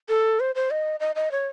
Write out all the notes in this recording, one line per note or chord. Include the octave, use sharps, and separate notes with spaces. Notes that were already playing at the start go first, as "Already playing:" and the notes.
A4
C5
C5
D#5
D#5
D#5
C#5